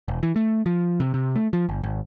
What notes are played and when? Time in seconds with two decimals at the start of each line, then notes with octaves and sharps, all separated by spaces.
0.08 E1
0.23 E3
0.36 A3
0.66 F3
1.00 C3
1.14 C3
1.36 A3
1.53 F3
1.69 G1
1.83 G#1